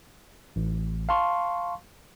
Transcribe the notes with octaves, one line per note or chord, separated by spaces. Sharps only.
A1
F5 A5 C6 C#6